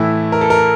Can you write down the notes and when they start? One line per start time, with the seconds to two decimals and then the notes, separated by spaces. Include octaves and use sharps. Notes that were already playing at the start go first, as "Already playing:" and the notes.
Already playing: A2 E3 A3 E4
0.32 A#4
0.41 A4
0.50 A#4